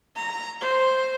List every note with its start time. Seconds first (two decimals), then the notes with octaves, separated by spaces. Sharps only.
0.16 A#5
0.61 C5